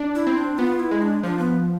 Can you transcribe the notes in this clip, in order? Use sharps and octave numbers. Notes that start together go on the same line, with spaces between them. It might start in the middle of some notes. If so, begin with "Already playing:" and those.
Already playing: D4
E4
C4
D4
B3 F4
E4
G#3
D4
F3 D4
B3